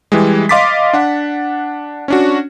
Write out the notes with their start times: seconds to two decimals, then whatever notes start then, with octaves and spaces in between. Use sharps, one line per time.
0.12 E3 G3 G#3
0.49 D#5 F5 C6 D6 A6 B6
0.93 D4 F#5
2.08 C#4 D4 F#4